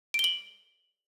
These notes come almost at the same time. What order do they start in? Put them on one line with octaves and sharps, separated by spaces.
D7 G7 F#7